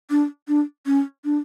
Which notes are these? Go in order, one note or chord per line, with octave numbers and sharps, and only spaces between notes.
D4
D4
C#4
D4